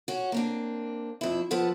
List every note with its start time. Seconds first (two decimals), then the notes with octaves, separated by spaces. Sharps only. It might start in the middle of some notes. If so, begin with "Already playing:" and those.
0.08 C#4 F#4
0.32 A#3 C4 D4
1.21 F2 E4
1.51 F3 B3 A4 F#5